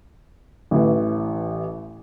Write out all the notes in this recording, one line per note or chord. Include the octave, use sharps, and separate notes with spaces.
A1 E3